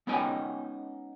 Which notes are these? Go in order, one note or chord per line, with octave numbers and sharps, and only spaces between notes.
G#3 B3 C#4 D#4 G5 G#5